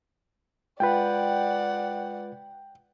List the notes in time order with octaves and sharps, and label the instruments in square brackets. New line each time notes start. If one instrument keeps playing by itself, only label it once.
[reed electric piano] G#3 F4 B4 [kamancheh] D5 F#5 [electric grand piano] G5